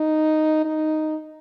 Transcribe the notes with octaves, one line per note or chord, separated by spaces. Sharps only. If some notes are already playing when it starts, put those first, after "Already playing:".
Already playing: D#4
D#4